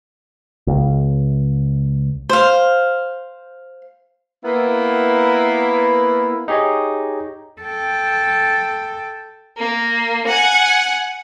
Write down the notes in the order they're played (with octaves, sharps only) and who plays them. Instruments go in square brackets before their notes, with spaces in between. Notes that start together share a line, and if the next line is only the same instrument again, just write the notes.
[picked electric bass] C#2
[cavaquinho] C5 F5
[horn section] A#3 B3 E4
[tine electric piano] D#4 G4 G#4 C#5 D#5
[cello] A4 G5
[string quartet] A#3
F#5 G#5